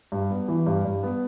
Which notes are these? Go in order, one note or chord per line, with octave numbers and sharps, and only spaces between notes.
G2
B3
E3
G2
G2
B3